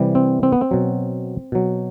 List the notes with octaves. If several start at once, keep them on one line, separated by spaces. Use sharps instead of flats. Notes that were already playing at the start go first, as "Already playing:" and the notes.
Already playing: C3 E3 G3
C4
C4
B3
C4
B2 F#3
B2 F#3